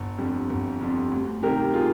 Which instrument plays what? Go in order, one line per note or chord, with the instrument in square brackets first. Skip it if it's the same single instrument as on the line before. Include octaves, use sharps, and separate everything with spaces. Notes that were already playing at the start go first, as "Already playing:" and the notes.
Already playing: [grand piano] G1
F2 D3 G3
G1
F2 D3 G3
D2
C3 D#3 G3 G4 A#4
F4 G#4